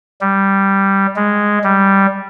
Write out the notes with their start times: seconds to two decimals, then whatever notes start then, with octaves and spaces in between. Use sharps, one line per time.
0.21 G3
1.16 G#3
1.64 G3